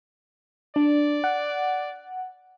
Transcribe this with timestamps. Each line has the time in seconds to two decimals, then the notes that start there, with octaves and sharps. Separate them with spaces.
0.76 D4 D5
1.24 F#5